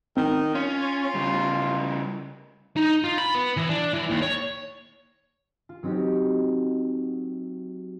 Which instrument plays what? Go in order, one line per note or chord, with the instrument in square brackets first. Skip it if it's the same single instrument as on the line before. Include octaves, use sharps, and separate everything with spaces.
[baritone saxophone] D#3 [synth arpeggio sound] C4
[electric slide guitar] C#4 [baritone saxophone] F4
[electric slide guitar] C#3 G3
[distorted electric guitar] D#4
F4
B5
B3
E3
D4
E3
D#2
C#5
[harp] F4
F#3 C4 D#4 F#4 G4